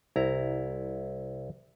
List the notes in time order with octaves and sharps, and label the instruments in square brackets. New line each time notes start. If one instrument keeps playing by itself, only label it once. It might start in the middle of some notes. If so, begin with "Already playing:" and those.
[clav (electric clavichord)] C2 E4 A#5